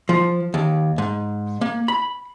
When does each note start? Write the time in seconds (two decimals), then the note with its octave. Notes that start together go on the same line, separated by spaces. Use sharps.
0.09 F3
0.54 D#2
0.98 G#2
1.61 A#3
1.88 B5